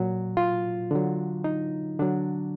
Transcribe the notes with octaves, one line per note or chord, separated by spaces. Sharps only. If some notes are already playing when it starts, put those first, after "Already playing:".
Already playing: A#2 F#3
F4
D3 F#3
D#4
D3 F#3 D4